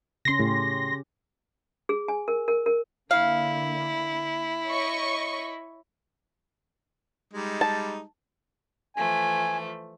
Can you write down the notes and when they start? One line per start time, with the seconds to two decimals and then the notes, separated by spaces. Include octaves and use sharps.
0.25 C#3 C#4 C6 A#6
0.39 A2 G4
1.89 G#4
2.08 G#5
2.28 A#4
2.48 A#4
2.66 A#4
3.11 D3 A#3 E4 F5
4.66 C#5 D#5 C#6
7.34 G3 G#3 D#4
7.61 A5
8.96 E3 F3 A3 G#5